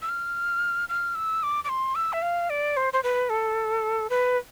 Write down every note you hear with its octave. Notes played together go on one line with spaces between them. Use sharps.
E6
F6
F6
E6
D6
D6
C6
E6
E5
F5
D5
C5
C5
B4
A4
B4